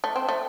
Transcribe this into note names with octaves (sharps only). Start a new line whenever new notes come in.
A3
C4
A3